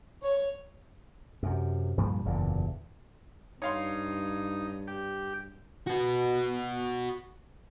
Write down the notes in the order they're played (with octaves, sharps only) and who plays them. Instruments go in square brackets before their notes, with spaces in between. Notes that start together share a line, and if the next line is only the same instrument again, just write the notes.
[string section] C#5
[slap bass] F#2 C3
G2 A#2 F3 G3
F#1 E2 A#2 D3
[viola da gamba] G2 [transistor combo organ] D#4 [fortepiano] C#5 F5 C6
[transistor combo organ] G4
[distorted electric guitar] F#4 B4